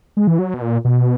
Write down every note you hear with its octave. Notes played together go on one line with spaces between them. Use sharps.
G#3
E3
F#3
B2
A#2
B2